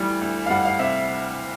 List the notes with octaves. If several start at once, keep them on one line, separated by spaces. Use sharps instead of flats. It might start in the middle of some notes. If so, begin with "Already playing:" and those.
Already playing: D2 E3 G3
D2
F5
G3 F#5
F5
C3 E5